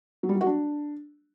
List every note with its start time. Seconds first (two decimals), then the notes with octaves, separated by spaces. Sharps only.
0.23 F#3
0.29 G3
0.35 F#3
0.41 F#4
0.47 D4